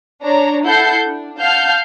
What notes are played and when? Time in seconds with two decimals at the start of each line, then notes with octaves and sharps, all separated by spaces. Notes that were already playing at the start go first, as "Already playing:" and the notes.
0.22 D4 C#5 A#5
0.65 E4 A4 F#5 G6 C7
1.08 D4
1.40 F5 F#5 A5 F6 G6 C7